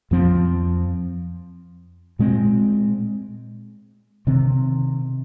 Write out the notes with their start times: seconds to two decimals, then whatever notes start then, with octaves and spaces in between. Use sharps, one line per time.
0.11 F2 F3 C4
2.19 A#2 G#3 C4
4.27 C3 D#3 C4